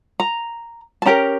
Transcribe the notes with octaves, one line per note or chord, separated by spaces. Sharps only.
A#5
A5
C#4 G4 A#4 A#5